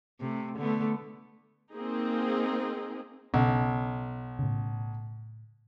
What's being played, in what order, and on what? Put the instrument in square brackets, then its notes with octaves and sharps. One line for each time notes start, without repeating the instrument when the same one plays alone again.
[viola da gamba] C3 A3
D3 A3 B3
[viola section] A#3 C4 D#4 G#4
[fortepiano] B1 [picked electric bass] C#3 C#4
[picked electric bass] A2 C#3